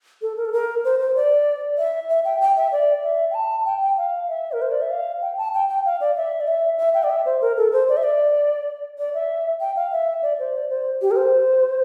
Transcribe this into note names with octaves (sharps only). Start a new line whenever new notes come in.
A4
A#4
A4
A#4
C5
C5
D5
E5
E5
G5
G5
E5
D5
E5
G5
A5
G5
G5
F5
E5
A#4
C5
D5
E5
F5
G5
A5
G5
G5
F5
D5
E5
D5
E5
E5
G5
D5
E5
C5
A#4
A4
C5
D5
E5
D5
D5
E5
G5
F5
E5
D5
C5
D5
C5
G4
A#4
C5